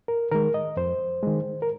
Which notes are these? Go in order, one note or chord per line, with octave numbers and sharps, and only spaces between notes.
A#4
D#3 G#3 A#4
D#5
F2 C5
D#3 G#3
A#4